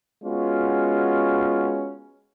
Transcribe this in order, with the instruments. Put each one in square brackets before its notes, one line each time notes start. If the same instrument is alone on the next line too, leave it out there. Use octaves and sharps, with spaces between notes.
[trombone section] G#3 B3 C#4 F4 F#4